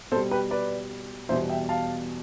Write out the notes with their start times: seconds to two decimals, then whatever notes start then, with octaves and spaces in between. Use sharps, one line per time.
0.11 B2 A4 C5
0.16 G3
0.31 G4 B4
0.51 B4 D5
1.29 E2 B2 G3 C5 E5
1.49 E5 G5
1.69 F5 A5